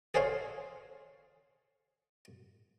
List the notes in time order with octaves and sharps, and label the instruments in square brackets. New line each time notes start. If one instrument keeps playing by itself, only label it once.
[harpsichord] G#4 A4 C5 C#5 F5